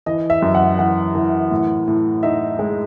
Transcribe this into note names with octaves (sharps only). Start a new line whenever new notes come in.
E3 D#5
E5
F#2
F#5
E3 F#5
E3
A2
A2
D#4 E5
G#3